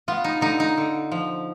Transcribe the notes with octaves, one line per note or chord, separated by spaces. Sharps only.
B3 F4
D#4
D3 D#4
D#4
D3
F3